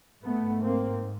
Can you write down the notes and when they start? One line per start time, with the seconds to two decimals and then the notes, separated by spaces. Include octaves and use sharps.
0.24 G#2 A3 B3
0.63 A#3 C4